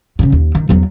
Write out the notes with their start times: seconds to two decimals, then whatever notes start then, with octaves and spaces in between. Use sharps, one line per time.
0.19 G2 C#3
0.32 D#2
0.55 D#3
0.69 E2 F#3